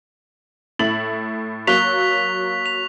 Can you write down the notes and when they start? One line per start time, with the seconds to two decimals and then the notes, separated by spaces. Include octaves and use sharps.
0.79 A2 E4 A6 F#7
1.67 F#3 A#3 C#6 F#6 B6 F7 G7
2.66 F7